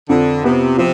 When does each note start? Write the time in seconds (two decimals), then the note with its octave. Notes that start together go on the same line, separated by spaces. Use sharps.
0.09 F2 D3
0.44 C3 B3
0.78 C3 F3